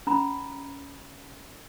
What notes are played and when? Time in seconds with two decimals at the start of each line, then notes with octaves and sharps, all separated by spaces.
0.07 C#4 A#5 B5